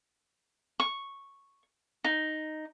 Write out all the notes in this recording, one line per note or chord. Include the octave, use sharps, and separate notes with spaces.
C#6
D#4